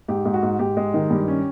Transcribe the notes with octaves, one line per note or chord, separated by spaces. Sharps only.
G#2 G4
G#2
F#4
G#2
G#2 G4
G#3
D#3
G2
C#4